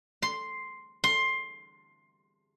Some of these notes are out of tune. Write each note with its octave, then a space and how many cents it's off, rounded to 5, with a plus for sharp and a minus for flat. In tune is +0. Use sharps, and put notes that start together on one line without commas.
C6 +0
C6 +15